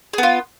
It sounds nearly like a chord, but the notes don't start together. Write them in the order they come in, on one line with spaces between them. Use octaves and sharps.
G#4 B3 F4